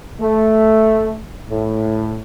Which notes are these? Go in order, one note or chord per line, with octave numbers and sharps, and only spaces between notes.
A3
A2